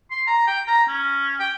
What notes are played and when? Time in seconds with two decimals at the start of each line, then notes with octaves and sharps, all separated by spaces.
0.10 C6
0.27 A#5
0.47 G5
0.67 A#5
0.88 C#4
1.39 G5